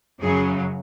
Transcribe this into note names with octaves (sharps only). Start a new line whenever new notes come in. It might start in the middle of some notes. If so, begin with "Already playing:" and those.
F#2 C#3 F#3 G#4